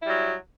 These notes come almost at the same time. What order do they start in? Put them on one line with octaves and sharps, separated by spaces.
E4 G3 F#3